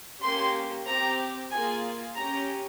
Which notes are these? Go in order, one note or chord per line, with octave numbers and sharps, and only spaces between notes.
A#3 C#4 G4 C6
C4 G4 A#5
A#3 F4 G#4 G#5
C#4 G4 A#5